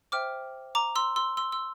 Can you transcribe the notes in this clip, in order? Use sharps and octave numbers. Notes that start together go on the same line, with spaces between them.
C5 E5 G5 D6 F6
A#5 D6
C6 E6
C6 E6
C6 E6
C6 E6